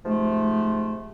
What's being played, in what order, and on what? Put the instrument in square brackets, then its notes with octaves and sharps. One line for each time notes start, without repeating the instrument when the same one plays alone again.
[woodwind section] G#2 C3 F3 G#3 A3